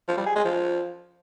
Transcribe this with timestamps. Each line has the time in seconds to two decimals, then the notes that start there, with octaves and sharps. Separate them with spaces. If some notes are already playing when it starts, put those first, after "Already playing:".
0.08 F3
0.17 G3
0.26 G#4
0.35 G#3
0.45 F3